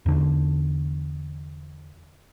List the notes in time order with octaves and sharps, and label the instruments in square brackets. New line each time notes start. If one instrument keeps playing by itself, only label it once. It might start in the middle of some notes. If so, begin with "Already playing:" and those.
[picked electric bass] E2 D3